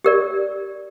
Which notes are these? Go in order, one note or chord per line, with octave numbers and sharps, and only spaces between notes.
G4 A#4 D5